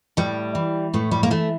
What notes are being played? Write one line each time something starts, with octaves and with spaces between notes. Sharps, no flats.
A2 G3
E3
A2 A3
G3
A#3
E3 A3